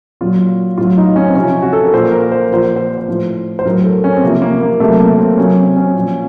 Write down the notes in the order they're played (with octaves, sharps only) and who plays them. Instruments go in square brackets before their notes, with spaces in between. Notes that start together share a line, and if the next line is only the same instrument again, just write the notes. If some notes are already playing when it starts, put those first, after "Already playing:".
[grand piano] A#2 F#3 F4
A2 F#3 F4
D#4
C#4
C4
C3 F3 C#4
F#4
A4
A#4
A#2 F3 C5
A#4
C5
A#2 F3 C5
C5
C5
A2 F3
C5
A2 F#3 A#4
A4
C#4
C4
C3 F3 A#3
A#3
A#3
C3 F#3 A3
A#3
C4
C3 F#3 C#4
C4
C#4
A#2 F3